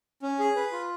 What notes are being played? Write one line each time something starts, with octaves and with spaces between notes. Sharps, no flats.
C#4
G#4
B4
F4